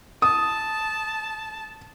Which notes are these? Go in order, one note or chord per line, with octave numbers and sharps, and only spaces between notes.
A5 D#6